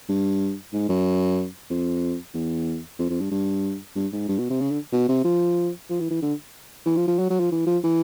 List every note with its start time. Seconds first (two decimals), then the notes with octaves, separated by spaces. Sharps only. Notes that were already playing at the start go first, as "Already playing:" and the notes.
0.09 G2
0.73 G#2
0.89 F#2
1.70 F2
2.35 E2
2.99 F2
3.10 F2
3.21 G2
3.31 G2
3.96 G2
4.13 G#2
4.29 G2
4.38 B2
4.50 C3
4.61 C#3
4.71 D3
4.92 B2
5.09 C3
5.25 F3
5.90 F3
6.00 E3
6.11 E3
6.22 D3
6.86 E3
6.97 F3
7.08 F3
7.19 F#3
7.30 F#3
7.40 F3
7.52 E3
7.67 F3
7.84 E3